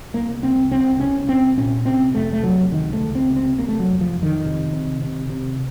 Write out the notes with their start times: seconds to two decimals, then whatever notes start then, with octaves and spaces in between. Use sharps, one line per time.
0.14 C2 A#3
0.42 C2 C4
0.71 C2 C4
1.00 C2 C#4
1.28 C2 C4
1.57 A#2 C#4
1.85 C3 C4
2.15 F2 A3
2.33 A3
2.43 C3 F#3
2.72 C#2 D#3
2.93 A3
3.00 C#2
3.15 C4
3.29 C3
3.36 C4
3.58 C3 A#3
3.69 A3
3.79 F#3
3.87 F2
4.01 F3
4.15 F2
4.23 D#3
4.44 C3
4.73 C3
5.01 C3
5.30 C3